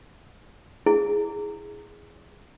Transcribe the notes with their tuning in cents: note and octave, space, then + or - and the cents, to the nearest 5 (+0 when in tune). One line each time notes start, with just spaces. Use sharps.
E4 +0 G#4 +0